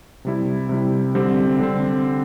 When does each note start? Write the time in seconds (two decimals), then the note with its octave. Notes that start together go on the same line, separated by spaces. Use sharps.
0.25 C3 G3 E4
0.69 C3 G3 E4
1.15 D3 G3 C4
1.59 D3 G3 C4